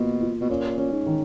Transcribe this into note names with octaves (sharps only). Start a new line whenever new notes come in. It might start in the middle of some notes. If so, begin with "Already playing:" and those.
Already playing: B2 A#3 F4
F4
B2
A#2 C#4
C#4
G#2
D#3